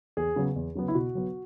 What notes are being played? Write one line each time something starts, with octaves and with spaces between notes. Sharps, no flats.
E2 G#4
C#3 F#3 B3
E2
C#3 F#3 B3
E4
B2 F#4
F#3 B3